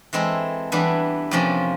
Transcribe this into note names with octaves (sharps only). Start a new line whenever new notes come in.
E3 G#3 C4 E4 A4
E3 G3 B3 D4
F2 C3 F3 A#3 C#4